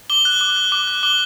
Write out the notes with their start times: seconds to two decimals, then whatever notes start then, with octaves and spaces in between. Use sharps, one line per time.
0.10 D6 G7
0.25 F#6
0.41 D6
0.56 F#6
0.72 D6
0.87 F#6
1.03 D6 G7